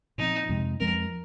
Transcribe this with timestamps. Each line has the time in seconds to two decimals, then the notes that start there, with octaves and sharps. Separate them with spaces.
0.18 A#2 F3 C4 D#4
0.49 F2 C3 G#3 C4
0.80 F2 F3 G#3 C4 A#4